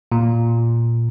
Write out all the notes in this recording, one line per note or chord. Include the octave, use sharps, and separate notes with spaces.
A#2